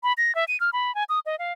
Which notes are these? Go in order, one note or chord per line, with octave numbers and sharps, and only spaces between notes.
B5
A#6
E5
D#7
F6
B5
G#5
D#6
D#5
F5